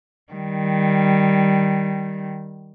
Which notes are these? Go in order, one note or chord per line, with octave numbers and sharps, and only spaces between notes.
D#3 G3